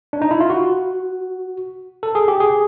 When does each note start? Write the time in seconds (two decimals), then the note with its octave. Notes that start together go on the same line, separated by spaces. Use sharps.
0.13 D4
0.22 D#4
0.31 E4
0.40 F4
0.50 F#4
2.03 A4
2.15 G#4
2.28 G4
2.40 G#4